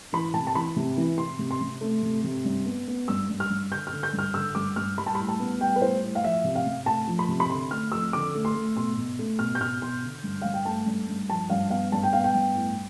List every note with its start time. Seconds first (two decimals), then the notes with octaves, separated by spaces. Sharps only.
0.13 E3 B5
0.34 C3 A5
0.47 A5
0.55 E3 B5
0.76 C3
0.97 E3
1.18 C3 C6
1.39 C3
1.51 C6
1.61 C3
1.81 A3
2.02 C3
2.24 C3
2.45 G2
2.66 B3
2.87 B3
3.08 G2 E6
3.30 G2
3.40 F6
3.50 G2
3.71 D3 G6
3.87 F6
3.92 D3
4.03 G6
4.13 G2
4.19 F6
4.34 D3 E6
4.55 G2 D6
4.76 G2 F6
4.98 G3 B5
5.07 A5
5.15 A2 B5
5.29 A5
5.40 B3
5.61 G3 G5
5.76 B4
5.81 A2 C5
6.02 A2
6.15 F5
6.23 F3 E5
6.44 C3
6.55 F5
6.66 C3
6.86 A3 A5
7.07 F3
7.19 B5
7.29 C3
7.40 B5
7.50 D3 C6
7.71 A3 F6
7.92 F2 E6
8.13 D3 D6
8.35 A3
8.45 C6
8.55 A3
8.76 B2 C6
8.97 B2
9.19 A3
9.39 B2 F6
9.55 G6
9.60 B2 F6
9.81 B2 C6
10.03 D3
10.23 G2
10.42 G2 F5
10.54 G5
10.65 A3 A5
10.86 G2
11.08 G2
11.29 F3 A5
11.50 G2 F5
11.70 B3 F5
11.92 G2 A5
12.03 G5
12.13 B3 F5
12.24 G5
12.34 G2
12.55 A2